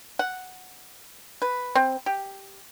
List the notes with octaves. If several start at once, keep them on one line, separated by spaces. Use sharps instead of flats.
F#5
B4
C4
G4